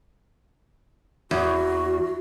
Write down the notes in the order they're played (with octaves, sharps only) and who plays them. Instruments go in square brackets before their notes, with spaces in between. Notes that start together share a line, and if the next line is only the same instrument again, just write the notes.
[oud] E2 [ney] F#4